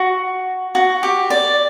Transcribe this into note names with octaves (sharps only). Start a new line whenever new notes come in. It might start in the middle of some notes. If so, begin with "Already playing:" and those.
Already playing: F#4
F#4
G4
D5